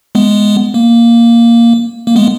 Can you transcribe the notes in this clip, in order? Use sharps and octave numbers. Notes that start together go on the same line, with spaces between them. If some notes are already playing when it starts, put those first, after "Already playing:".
G#3 B3
A#3
A#3
G#3 B3